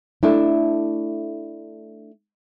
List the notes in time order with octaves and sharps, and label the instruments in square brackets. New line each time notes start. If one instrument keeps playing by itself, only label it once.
[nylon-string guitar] A3 D4 E4